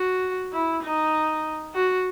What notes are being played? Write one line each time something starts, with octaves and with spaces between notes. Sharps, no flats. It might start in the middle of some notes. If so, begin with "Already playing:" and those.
Already playing: F#4
E4
D#4
F#4